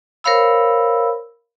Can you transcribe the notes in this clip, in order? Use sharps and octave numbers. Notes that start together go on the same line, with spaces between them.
A#4 C5 C#5 F5 B5 E6